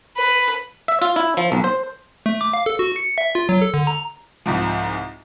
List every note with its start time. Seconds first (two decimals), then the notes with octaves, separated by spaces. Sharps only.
0.17 B4
0.88 E5
1.02 F4
1.16 E4
1.37 F3
1.52 B1
1.64 C5
2.26 A3
2.41 D6
2.53 F5
2.66 A4
2.79 F#4
2.96 C#7
3.18 E5
3.35 F4
3.49 F#3
3.62 A4
3.74 D3
3.87 A#5
4.46 C2 G#2 F3